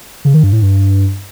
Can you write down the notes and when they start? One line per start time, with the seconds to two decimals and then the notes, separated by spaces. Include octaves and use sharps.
0.25 C#3
0.34 D#3
0.43 G2
0.52 A2
0.62 G2